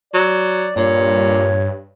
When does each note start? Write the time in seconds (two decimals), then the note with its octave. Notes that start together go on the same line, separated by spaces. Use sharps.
0.14 F#3 D5
0.76 G2 A#2 C#5